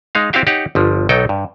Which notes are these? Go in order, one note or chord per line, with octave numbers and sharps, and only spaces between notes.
G#3 D#4 F5
C4 E4 F#4 G4 F5 G5
D#4 G4 C#5 F#5
G1 F3
B1 F#3 D#4 A4 G5
G2